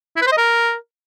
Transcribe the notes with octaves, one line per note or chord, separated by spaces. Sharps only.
E4
B4
C5
D#5
A#4